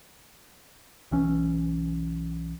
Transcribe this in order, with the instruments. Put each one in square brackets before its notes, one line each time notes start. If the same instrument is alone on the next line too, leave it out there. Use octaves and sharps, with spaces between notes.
[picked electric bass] B1 E3 C#4